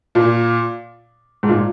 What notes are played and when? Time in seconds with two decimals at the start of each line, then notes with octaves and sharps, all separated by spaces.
0.15 A#2
1.43 G#2
1.49 A#2